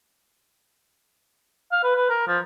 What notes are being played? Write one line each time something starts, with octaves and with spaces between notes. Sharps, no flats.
F5
B4
B4
A#4
F3